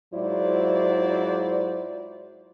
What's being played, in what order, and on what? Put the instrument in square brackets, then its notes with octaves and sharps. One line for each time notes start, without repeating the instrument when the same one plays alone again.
[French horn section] G#2 F#3 E4 F4 C5 D5